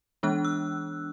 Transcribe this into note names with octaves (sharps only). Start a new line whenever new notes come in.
E3 G#3 B3 D4 F#6
E6